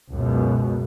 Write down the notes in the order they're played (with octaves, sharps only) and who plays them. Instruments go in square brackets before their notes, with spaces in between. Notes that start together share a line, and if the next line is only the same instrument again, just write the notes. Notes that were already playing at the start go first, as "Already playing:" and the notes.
[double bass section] C#2 F#2 B2